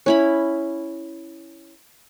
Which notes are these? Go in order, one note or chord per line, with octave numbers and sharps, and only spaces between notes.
C#4 E4 B5